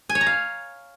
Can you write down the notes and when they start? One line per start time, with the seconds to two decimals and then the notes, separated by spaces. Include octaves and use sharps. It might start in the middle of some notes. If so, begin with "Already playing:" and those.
0.09 G#5
0.15 C#5
0.21 A#5
0.26 F5